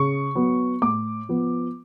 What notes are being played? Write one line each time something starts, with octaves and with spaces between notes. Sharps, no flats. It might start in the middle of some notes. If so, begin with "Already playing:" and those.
Already playing: C#3 C#6
F#3 B3
A2 D6
F3 B3